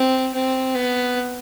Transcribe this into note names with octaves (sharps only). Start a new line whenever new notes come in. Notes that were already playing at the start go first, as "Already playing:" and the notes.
Already playing: C4
C4
B3